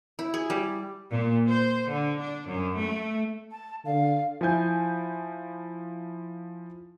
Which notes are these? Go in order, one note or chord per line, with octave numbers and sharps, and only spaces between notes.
E4
G#4
G3
A#2
C5
D3
D4
F#2
A3
A5
D3 F5
F3 E4 G#5 G6